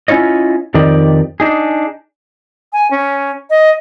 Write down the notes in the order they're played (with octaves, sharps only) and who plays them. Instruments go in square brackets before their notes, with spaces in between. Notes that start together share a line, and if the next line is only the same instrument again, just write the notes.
[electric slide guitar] C#4 E4 F4 C#5 D#5
F2 D#3 D#4 G4 D5
D4 D#4 G#4
[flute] G#5
C#4
D#5